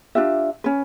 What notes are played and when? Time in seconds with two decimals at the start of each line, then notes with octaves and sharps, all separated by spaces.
0.15 D4 F4 G4 E5
0.64 C#4 B4